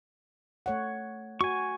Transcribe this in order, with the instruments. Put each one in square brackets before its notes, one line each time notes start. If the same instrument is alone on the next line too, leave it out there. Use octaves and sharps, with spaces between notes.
[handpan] A3 C#5 F#5
[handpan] F#4 [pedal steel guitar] G#5 C#6